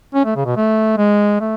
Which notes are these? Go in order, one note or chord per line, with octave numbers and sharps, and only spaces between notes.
C#4
A3
C#3
B2
A3
G#3
A3